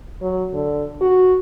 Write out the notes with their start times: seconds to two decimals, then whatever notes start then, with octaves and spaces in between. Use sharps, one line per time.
0.22 F#3
0.53 D3
1.01 F#4